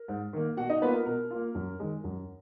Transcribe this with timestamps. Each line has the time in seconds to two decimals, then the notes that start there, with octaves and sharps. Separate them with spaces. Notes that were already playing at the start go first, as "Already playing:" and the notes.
Already playing: A#4
0.08 G#2
0.33 D#3 A#3
0.57 B2 F#4 F#5
0.69 D#4 D#5
0.81 A#3 B3 F4 B4
0.94 A#4
1.06 B2 A#4
1.30 A#3 F4
1.55 F#2
1.80 D#3 G#3
2.04 F#2